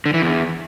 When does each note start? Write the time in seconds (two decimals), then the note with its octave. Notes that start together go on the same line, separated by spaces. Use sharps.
0.06 D3
0.14 E3
0.22 E2